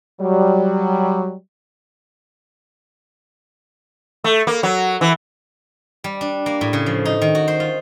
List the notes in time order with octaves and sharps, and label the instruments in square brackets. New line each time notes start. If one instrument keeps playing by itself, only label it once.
[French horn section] F#3 G3
[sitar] A3
A#3
F#3
E3
[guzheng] G3
D4
A#3
A2
C#3
F3
D#4
D#3
F#4
C5
F4